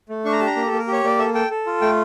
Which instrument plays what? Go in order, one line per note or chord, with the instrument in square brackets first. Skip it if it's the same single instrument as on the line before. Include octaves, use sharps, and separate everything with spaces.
[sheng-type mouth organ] A3
D4 C#6
A#5
G4 A5
A#5
A#3
A4
A#3
A#4
G4
C#5
A#3 D5
A4 E5
A4 G5
A4
F4
A3 G5